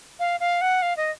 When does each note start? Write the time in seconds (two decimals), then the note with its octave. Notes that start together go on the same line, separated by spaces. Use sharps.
0.19 F5
0.40 F5
0.61 F#5
0.82 F5
0.97 D#5